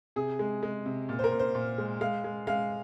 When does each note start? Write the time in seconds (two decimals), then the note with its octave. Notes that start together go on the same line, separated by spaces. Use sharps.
0.16 C3 G#4
0.39 G#3
0.63 G#3
0.86 C3
1.09 A#2
1.19 C5
1.24 A#4
1.32 A#2
1.39 C5
1.55 A#2
1.78 G#3
2.01 G#3 F5
2.24 G#3
2.47 G#3 F5